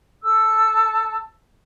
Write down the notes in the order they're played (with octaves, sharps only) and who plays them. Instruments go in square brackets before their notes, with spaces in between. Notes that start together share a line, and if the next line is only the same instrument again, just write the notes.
[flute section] A4 A5 E6